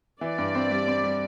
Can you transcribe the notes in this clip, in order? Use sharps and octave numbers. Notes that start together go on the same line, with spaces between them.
E3 D5
G2
C4
G3
C4
G3